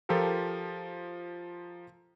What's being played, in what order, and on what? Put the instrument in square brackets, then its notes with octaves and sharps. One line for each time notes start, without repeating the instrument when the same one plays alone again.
[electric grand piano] F3 F4 G4 A4 A#4